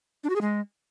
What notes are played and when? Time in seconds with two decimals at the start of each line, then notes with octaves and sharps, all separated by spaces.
0.24 D4
0.30 F#4
0.35 G#4
0.41 G#3